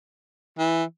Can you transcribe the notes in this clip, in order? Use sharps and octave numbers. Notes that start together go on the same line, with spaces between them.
E3